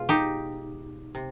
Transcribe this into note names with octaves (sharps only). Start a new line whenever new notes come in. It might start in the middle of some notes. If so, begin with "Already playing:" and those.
Already playing: B2 G#3 F4
D#4 G4
C3